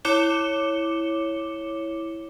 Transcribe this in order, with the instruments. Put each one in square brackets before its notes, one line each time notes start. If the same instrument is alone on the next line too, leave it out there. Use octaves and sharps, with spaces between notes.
[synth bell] E4 C#5 D6 C#7 E7 G7